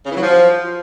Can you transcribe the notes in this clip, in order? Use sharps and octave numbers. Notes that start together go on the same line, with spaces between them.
C#3
E3
F#3
F3